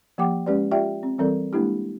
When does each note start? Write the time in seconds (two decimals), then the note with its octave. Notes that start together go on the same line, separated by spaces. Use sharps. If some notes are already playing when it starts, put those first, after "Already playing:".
0.18 F3 A#3 G4 F#5 G5 D6
0.46 G#3 C#4 G4 B4 D5
0.71 F4 G4 D5 E5 G5
1.03 C4
1.18 E3 G3 C4 A4 A#4 D5
1.53 G#3 A#3 D4 E4 G4